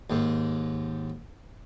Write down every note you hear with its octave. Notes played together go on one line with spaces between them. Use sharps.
D#2 G#2